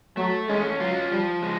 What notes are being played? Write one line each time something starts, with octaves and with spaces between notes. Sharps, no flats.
F#3 A3
G#3 C#4
F#3 F4
F3 G3
G#3